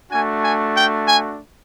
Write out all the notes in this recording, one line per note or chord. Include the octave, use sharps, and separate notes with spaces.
A3 D4 F#4 G#5
G#5
G5
G#5